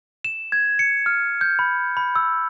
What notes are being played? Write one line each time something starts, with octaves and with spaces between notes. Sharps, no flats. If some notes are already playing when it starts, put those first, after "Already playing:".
E7
G#6
C#7
F6
G6
B5
B5
E6